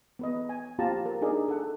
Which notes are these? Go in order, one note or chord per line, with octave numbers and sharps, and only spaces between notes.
B3 B4 D#5
G#5
A#3 C4 F4 G4 A5 A#5
A#4
D4 D#4 G#4 A#4 D5
A4 F#5